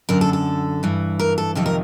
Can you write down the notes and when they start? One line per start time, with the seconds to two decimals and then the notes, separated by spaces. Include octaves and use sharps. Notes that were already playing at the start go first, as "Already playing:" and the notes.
0.09 F#2 D3 A#4
0.21 A4
0.33 A4
0.83 G2 E3
1.19 A#4
1.38 A4
1.55 F2 C3 D#3 A4
1.66 A#4